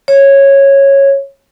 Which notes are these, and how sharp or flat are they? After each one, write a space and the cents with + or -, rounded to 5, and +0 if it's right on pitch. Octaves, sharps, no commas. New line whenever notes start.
C#5 -10